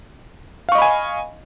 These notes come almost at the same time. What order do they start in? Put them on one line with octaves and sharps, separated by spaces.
F5 C#6 D#5 B5 G#5